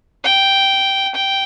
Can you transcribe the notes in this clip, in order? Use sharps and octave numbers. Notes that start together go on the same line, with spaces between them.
G5
G5